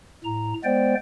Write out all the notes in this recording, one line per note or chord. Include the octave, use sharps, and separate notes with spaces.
A2 A#5
G#3 B3 C5 D5 G5